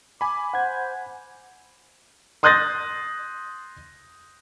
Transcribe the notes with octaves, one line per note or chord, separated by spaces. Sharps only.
G#5 B5 D6
C5 F#5 G#6
C6 D#6 F#6 G6 A6 A#6